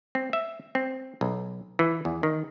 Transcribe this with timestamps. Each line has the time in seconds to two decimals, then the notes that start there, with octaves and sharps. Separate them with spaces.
0.15 C4
0.33 E5
0.75 C4
1.21 B1
1.79 E3
2.05 E2
2.23 D#3